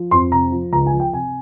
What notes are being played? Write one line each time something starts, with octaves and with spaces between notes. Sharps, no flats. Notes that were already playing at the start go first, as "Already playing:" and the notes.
Already playing: F3
F2 C6
C3 A#5
F3
C#2 A#5
G#5
F3
G5
C3 G#5